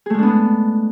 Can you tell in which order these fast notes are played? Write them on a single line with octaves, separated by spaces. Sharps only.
G#4 A3 G#3 D4 B3